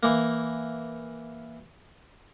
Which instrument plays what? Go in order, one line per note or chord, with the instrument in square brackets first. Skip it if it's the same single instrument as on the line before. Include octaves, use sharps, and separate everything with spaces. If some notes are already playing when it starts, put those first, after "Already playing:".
[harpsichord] E3 A#3